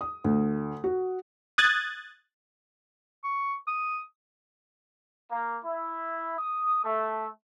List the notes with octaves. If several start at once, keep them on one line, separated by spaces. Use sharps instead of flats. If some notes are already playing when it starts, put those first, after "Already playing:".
D#6
D2
F#4
D#6 F#6 G#6 A6
C#6
D#6
A#3
E4
D#6
A3